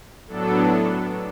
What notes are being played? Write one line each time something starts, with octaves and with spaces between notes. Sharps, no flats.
A2 F#3 B3 D4 A4